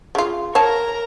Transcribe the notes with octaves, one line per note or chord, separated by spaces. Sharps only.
C#3 F4
A#4 C#5 F5 A5 A#5